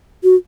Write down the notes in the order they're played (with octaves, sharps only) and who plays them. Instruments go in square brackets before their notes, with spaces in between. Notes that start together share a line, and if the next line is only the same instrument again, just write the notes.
[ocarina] F#4